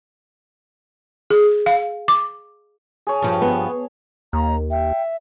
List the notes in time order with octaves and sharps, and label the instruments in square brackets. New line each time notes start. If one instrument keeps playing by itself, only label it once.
[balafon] G#4
F5
D6
[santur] G#4 C#5 A5
[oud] G2 F3
[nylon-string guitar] B3
[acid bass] D#2 [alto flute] A#3 [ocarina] A#5
[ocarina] E5 [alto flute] G5